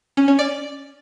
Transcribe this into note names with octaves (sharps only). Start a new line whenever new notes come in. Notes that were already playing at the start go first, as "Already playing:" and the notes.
C#4
C#4
D5